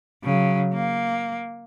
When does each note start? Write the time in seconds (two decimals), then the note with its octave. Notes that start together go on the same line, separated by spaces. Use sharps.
0.24 C#3 F#3
0.74 A#3